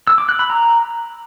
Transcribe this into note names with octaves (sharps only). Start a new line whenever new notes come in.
E6
D6
F#6
B5
A#5